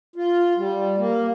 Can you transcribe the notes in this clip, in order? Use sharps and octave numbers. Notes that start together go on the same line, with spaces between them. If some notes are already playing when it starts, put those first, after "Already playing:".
F4
G3
A#3